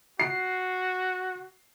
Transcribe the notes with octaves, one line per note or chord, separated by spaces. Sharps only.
F#4 C7